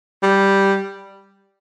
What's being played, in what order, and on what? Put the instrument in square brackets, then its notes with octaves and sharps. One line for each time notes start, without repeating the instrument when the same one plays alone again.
[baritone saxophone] G3